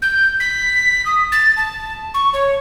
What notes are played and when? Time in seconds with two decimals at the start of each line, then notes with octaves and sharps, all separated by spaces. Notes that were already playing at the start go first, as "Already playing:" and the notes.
0.02 G6
0.40 B6
1.06 D#6
1.32 A6
1.57 A5
2.14 C#6
2.33 C#5